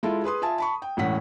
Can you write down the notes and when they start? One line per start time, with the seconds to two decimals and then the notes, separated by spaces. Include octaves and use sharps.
0.03 G#3 E4 F4 A4
0.24 G#4 B4 C6 D#6
0.42 F4 E5 G#5 A5
0.58 A5 B5 C#6
0.82 G5
0.97 E1 A2 C#4 F#5 B6